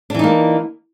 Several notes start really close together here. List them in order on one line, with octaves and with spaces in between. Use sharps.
D4 E3 D#4 A#3